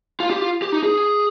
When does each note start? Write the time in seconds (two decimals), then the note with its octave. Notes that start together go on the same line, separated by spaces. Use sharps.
0.20 F4
0.30 G4
0.41 F4
0.62 G4
0.72 D#4
0.83 G#4